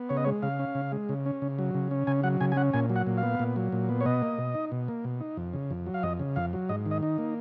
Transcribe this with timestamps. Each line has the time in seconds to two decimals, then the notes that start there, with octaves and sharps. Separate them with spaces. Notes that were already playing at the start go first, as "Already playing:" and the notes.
Already playing: B3
0.09 C#3 C#5
0.17 D#5
0.24 G#3 C#5
0.42 C#3 F5
0.59 C#4
0.75 C#3
0.92 G#3
1.09 C#3
1.26 C#4
1.42 C#3
1.59 F#3
1.74 C#3
1.91 C#4
2.07 C#3 G#5
2.23 F#3 F#5
2.41 C#3 G#5
2.52 G#5
2.56 C#4 F#5
2.73 A#2 G#5
2.90 F#3
2.96 F#5
3.07 A#2
3.18 F5
3.23 B3
3.39 A#2
3.56 F#3
3.72 A#2
3.89 B3
4.01 C#5
4.06 B2 D#5
4.22 A#3
4.38 B2
4.54 D#4
4.72 B2
4.88 A#3
5.05 B2
5.20 D#4
5.37 F2
5.54 C#3
5.70 F2
5.86 F#3
5.94 F5
6.03 F2 D#5
6.19 C#3
6.36 F2 F5
6.53 F#3
6.69 G#2 D#5
6.86 D#3
6.91 D#5
7.03 D#4
7.18 A#3